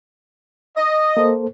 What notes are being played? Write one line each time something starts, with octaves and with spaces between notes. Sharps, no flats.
D#5
A#3 A4 C5